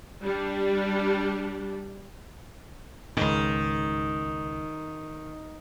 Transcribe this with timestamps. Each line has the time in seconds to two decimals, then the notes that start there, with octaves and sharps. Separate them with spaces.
0.22 G3 D4 G4
3.17 C#2 G#2 D#3